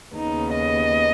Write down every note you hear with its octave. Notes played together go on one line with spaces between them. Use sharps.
D#2 C#3 B3 D#4
D#5